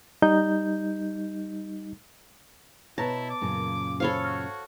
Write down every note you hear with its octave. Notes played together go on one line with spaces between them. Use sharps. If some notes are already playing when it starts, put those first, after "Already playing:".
G3 D#4 G6
B2 E4 B4 C#5 A5 A#5 A#6
D6
F#2 A#2 C#3
A4 C5 C#5 F5 B5
F#4 F6